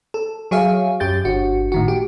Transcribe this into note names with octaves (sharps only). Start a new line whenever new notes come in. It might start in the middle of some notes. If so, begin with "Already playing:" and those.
A4
F#3 G#4 C#5 E5 F5
F#2 G4 G6 A6
G1 F#4
A2 D#3 F#4
G4